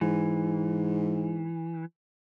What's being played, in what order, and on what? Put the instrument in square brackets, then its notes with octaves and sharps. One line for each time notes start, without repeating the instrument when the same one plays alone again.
[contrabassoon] G#2 [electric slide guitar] E3